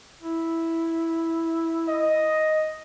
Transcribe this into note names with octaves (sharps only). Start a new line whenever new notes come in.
E4
D#5